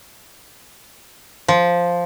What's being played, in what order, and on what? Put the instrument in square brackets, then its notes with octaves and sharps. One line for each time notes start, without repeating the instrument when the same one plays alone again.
[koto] F3